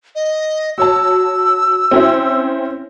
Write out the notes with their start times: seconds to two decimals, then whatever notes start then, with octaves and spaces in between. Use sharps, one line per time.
0.15 D#5
0.78 F#4 C#5 A5 E6
1.91 C4 C#4 E4